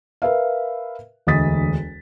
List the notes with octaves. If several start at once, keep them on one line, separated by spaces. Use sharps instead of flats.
A#4 B4 E5 F5
E1 D2 D#5 D#6 A6 B6